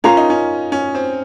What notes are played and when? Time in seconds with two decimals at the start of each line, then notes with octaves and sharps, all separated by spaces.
0.04 C#4 F4 A#4 F5 A#5
0.17 D#4
0.30 C#4
0.72 C#4
0.95 C4